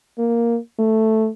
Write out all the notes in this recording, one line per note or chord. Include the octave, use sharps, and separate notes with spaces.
A#3
A3